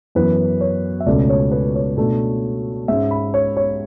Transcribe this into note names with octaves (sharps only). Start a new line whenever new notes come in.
F#2 E3 B3 B4
C#5
E5
C#2 B2 A3 C#4 D5
C#5
B4
C#5
B2 A3 D4
G#2 G#3 C#4 E5
B5
C#5
C#5